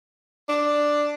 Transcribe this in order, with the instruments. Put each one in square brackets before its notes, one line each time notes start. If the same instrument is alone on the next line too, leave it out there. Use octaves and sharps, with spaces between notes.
[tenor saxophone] D4